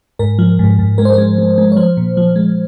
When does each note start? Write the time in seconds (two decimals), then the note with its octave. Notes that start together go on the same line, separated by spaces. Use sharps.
0.19 G#2 A#4
0.39 F3
0.59 G#2
0.79 G#2
0.98 G#3 A#4
1.05 C5
1.12 A#4
1.18 G#3
1.38 G#3
1.58 G#3
1.72 C#5
1.77 F3 C5
1.97 A#2
2.17 F3
2.36 G#3